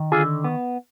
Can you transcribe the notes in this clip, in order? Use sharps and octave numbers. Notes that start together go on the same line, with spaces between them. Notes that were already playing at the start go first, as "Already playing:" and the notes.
Already playing: D#3
D3 F4 G#4
B3